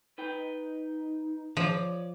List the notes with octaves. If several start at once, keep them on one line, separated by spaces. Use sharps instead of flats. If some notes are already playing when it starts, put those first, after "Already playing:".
D#4 B4 G5
F3 C#5 D5